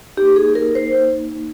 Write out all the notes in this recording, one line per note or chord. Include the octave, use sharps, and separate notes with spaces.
A#3 D#4 G4
G#4
A#4
C5